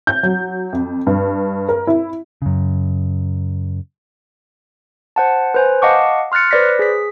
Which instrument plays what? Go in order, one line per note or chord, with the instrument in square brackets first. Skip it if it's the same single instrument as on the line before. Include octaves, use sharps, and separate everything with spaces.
[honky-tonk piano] G6
F#3
F2
G2
A#4
E4
[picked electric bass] F#2 C#3
[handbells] C5 F#5 A5
B4 C5 G#5
D#5 F5 F#5 A5 C#6 D6
C6 F6 F#6 A6 C#7
B4 C5 D5 A#6 B6
G#4 B6